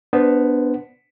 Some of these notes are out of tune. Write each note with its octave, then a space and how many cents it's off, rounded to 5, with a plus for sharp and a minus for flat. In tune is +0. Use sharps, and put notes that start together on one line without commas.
B3 +0 D4 +0 C5 -20